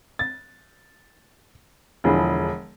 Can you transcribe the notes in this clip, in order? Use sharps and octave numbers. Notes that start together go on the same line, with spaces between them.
A6
E1 D3 F3 E4 G#4